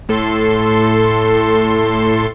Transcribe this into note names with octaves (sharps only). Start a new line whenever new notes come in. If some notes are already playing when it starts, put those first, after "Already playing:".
A2 A4 C6